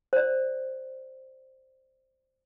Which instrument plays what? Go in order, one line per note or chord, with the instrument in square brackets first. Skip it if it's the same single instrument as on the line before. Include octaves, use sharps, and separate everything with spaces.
[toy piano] C5 D5